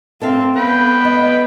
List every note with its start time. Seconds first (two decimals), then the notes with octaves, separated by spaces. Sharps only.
0.22 C4 A4 E5 F5
0.56 B3 B4 G5 B5
1.05 D#5